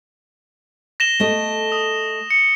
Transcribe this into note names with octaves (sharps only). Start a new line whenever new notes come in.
A#6 E7 G7
A3 D#5
D#6
C#7